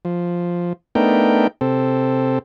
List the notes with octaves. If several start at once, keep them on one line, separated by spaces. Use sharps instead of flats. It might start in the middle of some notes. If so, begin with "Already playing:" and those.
F3
A3 B3 D4 D#4 A#4 G5
C3 C4 A4